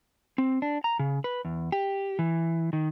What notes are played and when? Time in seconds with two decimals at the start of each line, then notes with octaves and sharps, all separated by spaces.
0.38 C4
0.62 D4
0.84 A#5
0.99 C#3
1.24 B4
1.45 E2
1.72 G4
2.19 E3
2.73 D#3